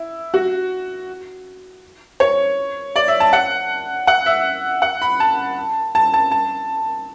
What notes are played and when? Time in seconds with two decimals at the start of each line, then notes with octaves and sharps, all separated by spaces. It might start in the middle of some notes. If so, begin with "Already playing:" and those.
Already playing: E4
0.34 F#4
2.20 C#5
2.96 D5
3.08 E5
3.20 A5
3.33 F#5
4.07 F#5
4.26 E5
4.82 F#5
5.02 B5
5.20 A5
5.95 A5
6.14 A5
6.31 A5